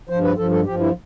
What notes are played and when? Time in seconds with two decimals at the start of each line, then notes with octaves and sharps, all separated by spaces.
0.09 G2 F3 C5
0.23 B4
0.37 G2 F3 A4
0.51 A4
0.66 G2 F3 G4
0.80 E4